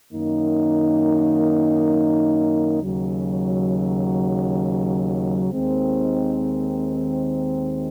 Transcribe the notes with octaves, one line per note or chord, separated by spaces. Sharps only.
F#2 D#3 A#3 D#4
D#2 C#3 F#3
D#2 D#3 G#3 C4